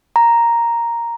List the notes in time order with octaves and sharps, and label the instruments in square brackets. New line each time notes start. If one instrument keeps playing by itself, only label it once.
[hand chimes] A#5